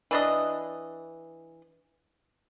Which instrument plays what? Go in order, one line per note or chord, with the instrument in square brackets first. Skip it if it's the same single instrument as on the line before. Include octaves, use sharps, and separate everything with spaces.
[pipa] E3 D4 D#5